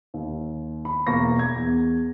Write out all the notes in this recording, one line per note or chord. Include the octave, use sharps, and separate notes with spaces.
D#2
B5
E1 A#3 C#6 A#6
G#6
E2